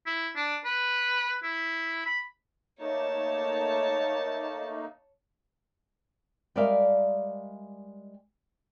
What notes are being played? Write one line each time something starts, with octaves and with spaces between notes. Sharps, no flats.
E4
D4
B4
E4
B5
A3 A#3 D#4 C#5 A5
G3 G#3 A#4 D5 E5 F5